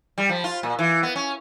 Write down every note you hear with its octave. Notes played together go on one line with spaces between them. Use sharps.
G3
F3
F4
A#2
E3
B3
C#4